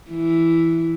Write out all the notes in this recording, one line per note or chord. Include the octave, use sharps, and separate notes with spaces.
E3